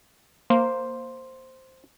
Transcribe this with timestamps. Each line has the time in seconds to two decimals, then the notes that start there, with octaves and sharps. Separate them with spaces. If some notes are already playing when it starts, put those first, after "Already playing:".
0.50 A#3 C5